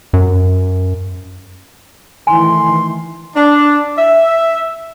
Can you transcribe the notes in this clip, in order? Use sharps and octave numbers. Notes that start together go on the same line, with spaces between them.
F#2
D#3 E3 A3 G#5 C6
D4
E5